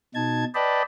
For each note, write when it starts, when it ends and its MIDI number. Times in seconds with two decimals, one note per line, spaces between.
0.15 0.45 47
0.15 0.45 63
0.15 0.45 81
0.15 0.45 92
0.55 0.82 71
0.55 0.82 74
0.55 0.82 75
0.55 0.82 79
0.55 0.82 81
0.55 0.82 83